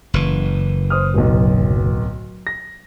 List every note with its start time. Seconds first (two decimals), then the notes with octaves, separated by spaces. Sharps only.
0.14 F#1 E3
0.90 C5 D#6 F6
1.14 D1 B1
2.47 A#6